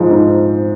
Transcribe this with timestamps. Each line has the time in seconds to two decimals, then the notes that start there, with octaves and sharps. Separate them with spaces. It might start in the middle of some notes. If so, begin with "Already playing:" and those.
Already playing: G#2 F3 G#3 D#4
0.11 G#2